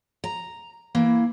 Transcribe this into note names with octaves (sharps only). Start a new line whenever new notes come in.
A#5
E3 A#3 E4